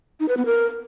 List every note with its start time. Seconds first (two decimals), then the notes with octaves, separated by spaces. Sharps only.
0.20 D#4
0.29 B4
0.37 B3
0.46 A#4